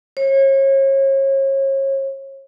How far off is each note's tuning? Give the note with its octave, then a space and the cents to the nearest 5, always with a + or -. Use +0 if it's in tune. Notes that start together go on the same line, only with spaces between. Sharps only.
C#5 -35